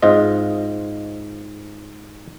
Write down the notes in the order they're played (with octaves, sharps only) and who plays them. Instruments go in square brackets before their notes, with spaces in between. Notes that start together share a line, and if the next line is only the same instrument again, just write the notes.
[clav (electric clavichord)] G#2 C4 F4 D#5